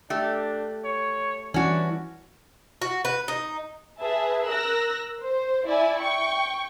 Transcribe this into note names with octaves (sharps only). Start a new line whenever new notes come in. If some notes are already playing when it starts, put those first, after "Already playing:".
A3 D4 G4
C#5
E3 G3 C#4 D4 E4 F#4
F#4
B4
D#4
G#4 B4 E5 A5
A#4 E6 F#6 A#6
C5
E4 D5 E5 G#5
G5 C#6